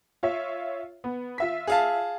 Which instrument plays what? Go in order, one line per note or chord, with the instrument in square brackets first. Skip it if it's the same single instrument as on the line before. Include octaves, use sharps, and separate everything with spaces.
[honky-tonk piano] F4 C#5 E5
B3
F4 E5 B6
[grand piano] G#4 F5 A5